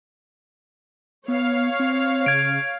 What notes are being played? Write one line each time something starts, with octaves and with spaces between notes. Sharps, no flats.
B3 C#5 F5
C4
C#3 G#6 D7